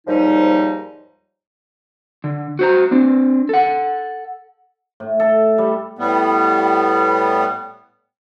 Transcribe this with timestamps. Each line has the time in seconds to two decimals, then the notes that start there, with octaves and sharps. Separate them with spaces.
0.07 D#2 G#2 F3 G3 D#4
2.24 D3
2.59 F#4 C5 A#5
2.91 C4 D4
3.49 A4 F#5
5.00 A2
5.20 A4
5.58 G3
5.99 A2 G3 B3